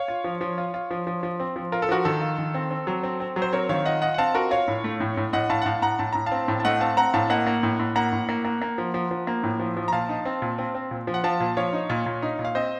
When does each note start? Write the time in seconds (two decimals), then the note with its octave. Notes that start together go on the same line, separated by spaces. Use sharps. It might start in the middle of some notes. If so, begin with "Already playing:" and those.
Already playing: C#5 F5
0.08 F4
0.24 F3
0.41 F3
0.58 F4
0.74 F4
0.91 F3
1.07 F3
1.23 F3
1.40 C4
1.56 F3
1.72 F4 A#4
1.82 A4
1.89 F3 F#4 A#4
2.05 D#3 A4
2.21 F4
2.38 D#3
2.54 C4
2.71 C4
2.87 F#3
3.03 C4
3.20 C4
3.36 F#3
3.42 C5
3.53 C4 A#4 C#5
3.69 D#3 C#5 F5
3.86 F4 D#5 F#5
4.02 F4 D#5 F#5
4.14 F#5
4.18 C4 F5 A5
4.34 F4 F#4 A#4
4.51 F4 C#5 F5
4.68 A2
4.84 A3
5.00 A2
5.17 A2
5.33 A2 D#5 F#5
5.50 A2 F5 A5
5.62 F#5
5.66 A2 F5 A5
5.82 A2 F#5 A#5
5.99 A2 A5
6.13 A2 A#5
6.26 F5 A5
6.32 C4
6.48 A2
6.60 A5
6.65 A3 D#5 F#5
6.81 C4 F5 A5
6.97 C4 F#5 A#5
7.14 A2 F5 A5
7.30 A#3 D#5 F#5
7.47 A#3
7.63 A2
7.79 A2
7.96 A#3 F#5 A#5
8.13 A2
8.29 A#3
8.45 A#3
8.62 A#3
8.78 F3
8.94 F3
9.11 F3
9.27 A#3
9.43 A2
9.60 F3
9.76 F3
9.88 A#5
9.92 A#2 F5 A5
10.09 D#4
10.25 C4
10.42 A#2
10.58 C4
10.75 C4
10.91 A#2
11.07 F3
11.14 F#5
11.24 F3 F5 A5
11.40 A#2
11.57 F3 C#5 F5
11.73 D#4
11.90 A#2
12.06 A#2
12.22 D#4
12.39 A#2
12.45 F5
12.55 C4 C5 D#5